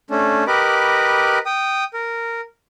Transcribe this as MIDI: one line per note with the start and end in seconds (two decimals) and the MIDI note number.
0.10 0.44 57
0.10 0.44 61
0.10 0.44 62
0.47 1.39 67
0.47 1.39 70
0.47 1.39 71
0.47 1.39 75
0.47 1.39 83
0.47 1.39 86
1.46 1.84 79
1.46 1.84 87
1.94 2.41 70